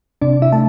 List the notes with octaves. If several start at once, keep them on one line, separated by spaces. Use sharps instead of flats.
C3 D4 D5
E4 E5
A3 A5